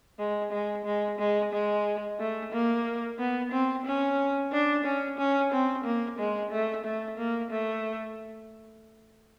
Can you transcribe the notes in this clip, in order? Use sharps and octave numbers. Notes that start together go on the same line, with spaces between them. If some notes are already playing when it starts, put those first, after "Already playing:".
G#3
G#3
G#3
G#3
G#3
A3
A#3
B3
C4
C#4
D4
C#4
C#4
C4
A#3
G#3
A3
A3
A#3
A3